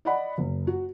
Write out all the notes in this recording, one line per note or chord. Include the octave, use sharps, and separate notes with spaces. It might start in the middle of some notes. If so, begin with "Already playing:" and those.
D5 D#5 F#5 B5
F#1
F#4